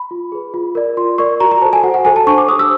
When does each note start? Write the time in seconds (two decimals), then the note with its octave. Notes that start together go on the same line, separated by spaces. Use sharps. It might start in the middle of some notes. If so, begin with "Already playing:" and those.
Already playing: B5
0.11 F4
0.32 G#4 B4
0.54 F4
0.75 A#4 D5
0.97 F4 C6
1.18 A#4 D5 C#6
1.40 F#4 A#5
1.51 A#5
1.62 A4 C5 A5
1.73 G#5
1.83 F#4 F#5
1.94 F#5
2.05 A4 C5 G#5
2.16 A5
2.27 D4 C#6
2.38 D6
2.48 C5 D#6
2.52 G4
2.59 E6